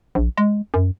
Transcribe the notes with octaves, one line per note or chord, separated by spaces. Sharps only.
A#1
G#3
F#2